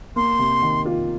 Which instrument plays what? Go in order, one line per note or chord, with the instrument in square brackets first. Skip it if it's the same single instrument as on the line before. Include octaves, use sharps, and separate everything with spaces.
[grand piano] A#3 [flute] C6
[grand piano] C3
D#3
F4